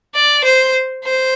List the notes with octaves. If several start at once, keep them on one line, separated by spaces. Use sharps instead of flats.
D5
C5
C5